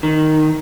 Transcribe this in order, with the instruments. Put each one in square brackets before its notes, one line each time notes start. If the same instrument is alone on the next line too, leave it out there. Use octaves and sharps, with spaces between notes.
[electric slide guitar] D#3